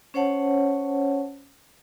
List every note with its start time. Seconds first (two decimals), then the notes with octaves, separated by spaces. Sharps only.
0.14 C#4 C5 C#5 F#5 A5